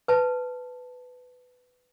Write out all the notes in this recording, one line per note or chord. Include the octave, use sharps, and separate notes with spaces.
B4 A5